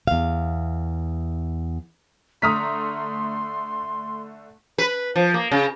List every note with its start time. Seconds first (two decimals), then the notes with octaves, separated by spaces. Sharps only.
0.07 E2 F5
2.42 D3 A3 A#5 C6 D#6 F6 B6
4.78 B4
5.16 F3
5.34 A#3
5.51 C#3